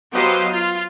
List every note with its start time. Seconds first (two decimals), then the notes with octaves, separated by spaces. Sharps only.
0.13 F#3 B3 G4 C5 D#5 F5
0.51 F4